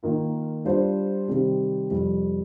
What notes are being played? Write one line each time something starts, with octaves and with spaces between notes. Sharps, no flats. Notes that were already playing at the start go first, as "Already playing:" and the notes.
D#3 A#3 F4
G3 D4 F4 C5
C3 D#3 G3 C4 G4
F2 C3 G3